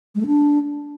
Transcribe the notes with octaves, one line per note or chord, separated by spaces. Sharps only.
G#3
A3
D4